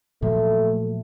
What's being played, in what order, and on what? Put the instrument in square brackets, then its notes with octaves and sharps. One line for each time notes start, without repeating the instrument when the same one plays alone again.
[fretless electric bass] A#2 F3 F#3 [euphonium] A3